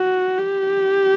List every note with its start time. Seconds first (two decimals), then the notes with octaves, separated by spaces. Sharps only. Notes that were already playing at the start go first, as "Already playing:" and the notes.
Already playing: F#4
0.38 G4